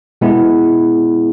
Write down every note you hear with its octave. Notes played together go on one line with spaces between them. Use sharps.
B2 G#3 B3 E4 G#4